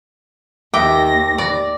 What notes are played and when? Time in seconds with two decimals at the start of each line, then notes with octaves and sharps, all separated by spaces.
0.74 D#2 E5 G5 D6 A#6
1.38 D5